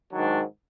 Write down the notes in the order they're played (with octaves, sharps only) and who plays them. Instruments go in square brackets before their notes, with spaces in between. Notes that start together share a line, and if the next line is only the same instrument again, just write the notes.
[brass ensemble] G#2 D#3 F#3 D4